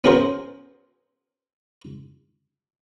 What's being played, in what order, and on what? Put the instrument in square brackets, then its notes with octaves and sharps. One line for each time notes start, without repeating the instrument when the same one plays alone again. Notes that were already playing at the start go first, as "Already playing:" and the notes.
[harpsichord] B3 C#4 F#4 G#4 A#4 C5